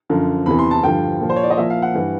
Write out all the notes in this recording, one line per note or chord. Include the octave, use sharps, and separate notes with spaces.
F#2 D3 F3
E2 C3 E3 B5
C6
A5
G2 D3 F3 G5
A#2 F3
C5
C#5
D5
D#5
A#2 F3 E5
F5
F#5
G2 E3